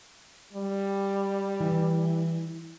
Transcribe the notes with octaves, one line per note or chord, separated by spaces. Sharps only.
G3
E3